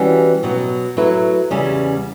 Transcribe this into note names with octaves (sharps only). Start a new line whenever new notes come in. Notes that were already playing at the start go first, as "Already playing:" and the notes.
Already playing: E3 G3 C#4 F#4
B2 F#3 B3
F#3 A3 E4 B4
E2 C#3 G3 C#4